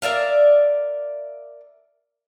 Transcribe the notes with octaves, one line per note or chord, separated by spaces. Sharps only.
A#4 D5 E5 F5